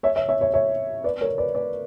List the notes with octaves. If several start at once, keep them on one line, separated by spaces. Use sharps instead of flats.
C#5 E5
C#5 E5
C#5 E5
C#5 E5
C#5 E5
B4 D5
A#4 C#5
B4 D5
B4 D5